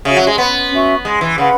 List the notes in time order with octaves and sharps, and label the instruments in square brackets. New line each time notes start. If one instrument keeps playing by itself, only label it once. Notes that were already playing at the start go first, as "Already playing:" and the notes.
[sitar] C#3 [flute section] F#4 C#5 E5
[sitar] F#3
G#3
B3
[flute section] C#4 F#4 E5 C#6
[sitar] G#3
E3
[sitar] C#3 [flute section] B4 F#5 B5